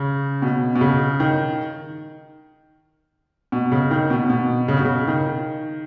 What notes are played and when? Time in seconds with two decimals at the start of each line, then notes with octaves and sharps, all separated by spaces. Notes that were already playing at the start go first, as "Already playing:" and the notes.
Already playing: C#3
0.42 B2
0.75 B2
0.81 C#3
1.20 D#3
3.52 B2
3.72 C#3
3.91 D#3
4.10 B2
4.30 B2
4.68 C#3
4.77 B2
4.85 C#3
5.07 D#3